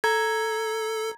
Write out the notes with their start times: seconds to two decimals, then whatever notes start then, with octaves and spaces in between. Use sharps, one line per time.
0.04 A4 A#5 G#6